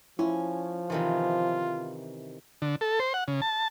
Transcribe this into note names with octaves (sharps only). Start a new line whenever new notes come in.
F3 C#4 E4
C3 D#3 E3 F4
D3
A4
C5
F#5
C#3
A5